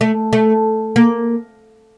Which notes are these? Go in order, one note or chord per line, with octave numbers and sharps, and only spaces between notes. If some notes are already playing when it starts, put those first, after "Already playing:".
A3
A3
A#3